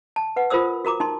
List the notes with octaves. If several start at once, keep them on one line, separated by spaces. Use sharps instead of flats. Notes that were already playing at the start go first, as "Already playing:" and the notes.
A5
B4 F#5
F4 A#4 C5 D#6 E6
F#4 A#4 A#5 D6
D#4 A5 C6